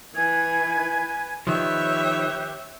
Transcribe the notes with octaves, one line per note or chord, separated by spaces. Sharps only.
E3 B4 G#5 G#6
D#3 F3 G4 B4 C#5 E5 F#6